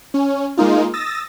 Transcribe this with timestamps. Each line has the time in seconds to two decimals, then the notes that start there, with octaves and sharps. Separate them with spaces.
0.14 C#4
0.57 G#3 A#3 D#4 F4
0.93 D#6 E6 A6 A#6